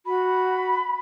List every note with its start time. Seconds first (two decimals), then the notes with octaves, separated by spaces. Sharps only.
0.06 F#4 B5